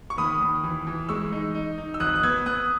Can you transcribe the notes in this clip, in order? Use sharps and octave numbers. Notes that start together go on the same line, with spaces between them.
C#6
D#2 B5 D#6
D#2
E3
E3
G#3 C#6 E6
D#4
D#4
D#4
E6
G#1 D#6 F#6
F#6
B3 E6 G#6
B3 D#6 F#6